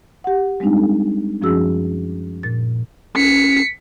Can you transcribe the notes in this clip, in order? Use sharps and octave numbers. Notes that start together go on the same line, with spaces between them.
G4 F#5
G3 G#3 C4 D4 D#4
A4
F#2 F3 C#4 F#4 G#4 E6
A#2 A6
C#4 B6 C#7